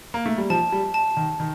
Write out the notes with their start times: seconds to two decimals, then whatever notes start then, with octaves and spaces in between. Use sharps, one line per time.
0.14 A#3
0.26 A3
0.38 G3
0.50 F3 A5
0.72 G3
0.94 A5
1.17 D#3
1.40 D#3